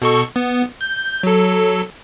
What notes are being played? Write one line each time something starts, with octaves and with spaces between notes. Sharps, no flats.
B2 A4 C#6
B3
G6
F#3 A4